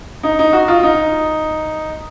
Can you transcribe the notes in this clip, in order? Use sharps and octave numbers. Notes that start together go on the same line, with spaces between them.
D#4
D#4
F#4
F4
D#4